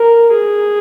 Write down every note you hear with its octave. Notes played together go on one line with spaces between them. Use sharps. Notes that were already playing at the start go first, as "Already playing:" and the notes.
Already playing: A#4
G#4